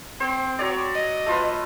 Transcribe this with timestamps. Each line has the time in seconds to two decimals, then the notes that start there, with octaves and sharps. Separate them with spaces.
0.20 C4 C5
0.59 F#3 C#5 D5
0.95 D#5
1.26 A3 F4 B4